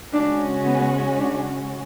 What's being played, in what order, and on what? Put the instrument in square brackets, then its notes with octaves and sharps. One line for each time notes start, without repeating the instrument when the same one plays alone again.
[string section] C#3 G#3 C#4 F#4 [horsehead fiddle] D4
[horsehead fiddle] B3
D4